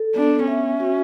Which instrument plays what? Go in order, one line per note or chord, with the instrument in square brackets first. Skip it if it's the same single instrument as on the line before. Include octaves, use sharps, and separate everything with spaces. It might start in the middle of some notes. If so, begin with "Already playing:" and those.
Already playing: [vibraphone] A4
[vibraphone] B3 [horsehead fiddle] D4
[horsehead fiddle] C#4 [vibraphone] E5
[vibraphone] F#4